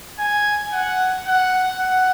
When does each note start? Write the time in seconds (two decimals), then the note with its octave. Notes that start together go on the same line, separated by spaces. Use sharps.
0.19 G#5
0.72 F#5
1.27 F#5
1.79 F#5